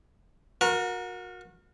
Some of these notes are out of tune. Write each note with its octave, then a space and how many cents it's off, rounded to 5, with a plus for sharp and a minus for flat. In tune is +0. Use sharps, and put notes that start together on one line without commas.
F#4 -30 A#4 +10